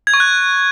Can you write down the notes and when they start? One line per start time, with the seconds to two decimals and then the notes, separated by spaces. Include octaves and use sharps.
0.07 G#6
0.14 C#6
0.20 F#6